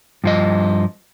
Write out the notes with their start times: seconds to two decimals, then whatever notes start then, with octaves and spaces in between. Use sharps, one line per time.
0.24 G2 F3 D#5